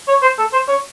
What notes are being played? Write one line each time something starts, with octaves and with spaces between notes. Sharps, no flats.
C#5
C5
A4
C5
C#5